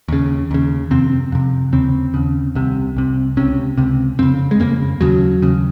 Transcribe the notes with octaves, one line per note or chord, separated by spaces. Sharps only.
D#2 C#3
D#2 C#3
F2 C3 C4
F2 C3
D#2 C#3 C4
D#2 C#3
C2 C3
C2 C3
C#2 C3 C#4
C#2 C3
F2 C#3 C4
G#3
F2 C#3 A#3
D#2 C#3 F#3
D#2 C#3